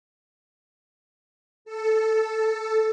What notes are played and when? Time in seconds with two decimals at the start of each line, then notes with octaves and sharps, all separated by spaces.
1.65 A4